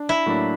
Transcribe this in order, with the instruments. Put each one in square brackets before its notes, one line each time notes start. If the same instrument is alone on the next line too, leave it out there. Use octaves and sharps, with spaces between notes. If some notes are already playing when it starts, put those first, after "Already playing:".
Already playing: [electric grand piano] D4
[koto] E4
[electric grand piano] A2 F#3 A#3 D4